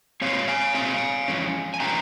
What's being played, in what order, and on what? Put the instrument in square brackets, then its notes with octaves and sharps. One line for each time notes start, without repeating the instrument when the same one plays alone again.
[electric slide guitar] A#2 G#3 C4 C#5 F5
F5 G#5
A#2 G#3 C4 F5 G#5
F2 E3 G#3 C#4
G#5
E3 G#3 C#4 G5 A#5